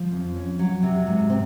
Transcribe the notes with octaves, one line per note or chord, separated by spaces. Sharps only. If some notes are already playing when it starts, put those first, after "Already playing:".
Already playing: F3
F2
C#4
F#3
C3
G#2
C4